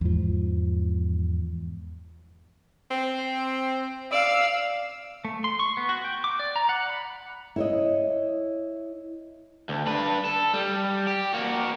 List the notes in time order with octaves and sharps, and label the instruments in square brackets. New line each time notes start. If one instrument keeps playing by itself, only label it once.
[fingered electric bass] E2 G#2 F3
[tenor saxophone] C4
[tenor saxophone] D5 [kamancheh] F5 E6
[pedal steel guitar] A3
C6
C#6
B3
F#4
G5
D6
D5
A#5
F#5
B5
[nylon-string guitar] E4 C#5 D#5
[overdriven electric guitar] D2
D4 B4
A4
G3
G4
A#3 F#4